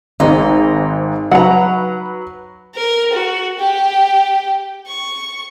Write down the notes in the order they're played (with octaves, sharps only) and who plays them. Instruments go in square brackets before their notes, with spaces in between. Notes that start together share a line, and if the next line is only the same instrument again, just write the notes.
[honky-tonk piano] G#1 G#2 [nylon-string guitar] D#4
[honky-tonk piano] F#3 B4 [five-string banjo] F#5 A#5
[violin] A#4
F#4
G4
C#6